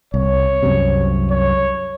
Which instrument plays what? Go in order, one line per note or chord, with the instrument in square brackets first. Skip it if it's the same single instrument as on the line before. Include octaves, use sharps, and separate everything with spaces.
[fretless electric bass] C2 [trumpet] C#5
[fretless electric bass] C2 F#2 C3
[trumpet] C#5